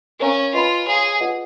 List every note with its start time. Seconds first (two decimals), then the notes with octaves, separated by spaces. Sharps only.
0.20 C#4 A#4 C#5 F5 A#5 C#6
0.54 F4 B4 D#5 G#5 B5
0.87 G#4 C#5 F5 A#5
1.21 F4 G#4 B4 D#5 F#5